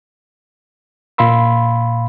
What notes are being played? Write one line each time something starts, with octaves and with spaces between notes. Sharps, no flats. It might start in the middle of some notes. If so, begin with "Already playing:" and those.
A#2 F5 B5 C6 E6